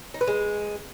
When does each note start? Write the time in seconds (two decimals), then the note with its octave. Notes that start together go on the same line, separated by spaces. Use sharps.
0.14 D#4
0.21 B4
0.28 G#3